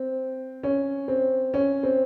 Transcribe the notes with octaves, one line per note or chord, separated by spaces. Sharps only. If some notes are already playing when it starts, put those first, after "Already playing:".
Already playing: C4
C#4
C4
C#4
C4